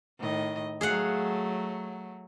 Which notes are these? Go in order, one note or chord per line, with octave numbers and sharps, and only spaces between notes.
A2 D#3 D#5
F#3 A3 G#4 F5 F#5